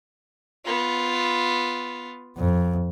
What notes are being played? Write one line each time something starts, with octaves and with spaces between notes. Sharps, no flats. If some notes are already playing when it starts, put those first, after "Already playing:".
B3 F4
F2